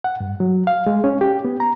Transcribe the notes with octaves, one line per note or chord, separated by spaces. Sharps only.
F#5
G2
F#3
F5
G#3
C#4
G4
B3
A#5